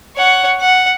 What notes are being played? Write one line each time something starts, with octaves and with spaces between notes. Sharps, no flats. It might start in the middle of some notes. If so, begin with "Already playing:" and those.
C#5 F#5
F#5